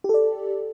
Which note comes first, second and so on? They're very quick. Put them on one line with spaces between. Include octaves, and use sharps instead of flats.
G4 A4 D5